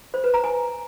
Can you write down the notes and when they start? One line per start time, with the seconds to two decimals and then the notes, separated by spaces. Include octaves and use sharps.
0.14 C5
0.24 B4
0.34 A#5
0.44 G#5